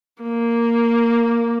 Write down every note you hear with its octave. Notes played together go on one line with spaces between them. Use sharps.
A#3